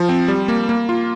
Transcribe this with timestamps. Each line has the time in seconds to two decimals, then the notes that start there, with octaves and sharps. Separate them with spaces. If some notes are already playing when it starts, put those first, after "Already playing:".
Already playing: F3
0.09 C4
0.28 G3
0.48 A#3
0.69 A#3
0.89 F4